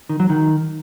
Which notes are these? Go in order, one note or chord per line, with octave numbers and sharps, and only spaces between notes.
D#3
F#3
D#3